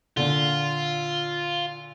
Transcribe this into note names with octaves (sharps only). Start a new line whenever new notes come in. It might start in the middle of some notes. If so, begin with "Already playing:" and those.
A#2 D3 F4